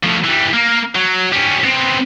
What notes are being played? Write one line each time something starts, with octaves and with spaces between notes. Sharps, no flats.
A2 F3
E3 G3
A#3 A#4
F#3
G3 C#4
B3 C4